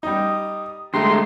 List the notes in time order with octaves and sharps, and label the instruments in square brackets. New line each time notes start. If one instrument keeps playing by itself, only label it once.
[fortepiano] G3 D#4 [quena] D#6
[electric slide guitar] D3 G#3 A3 [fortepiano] G4 [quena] A#5 [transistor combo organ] C6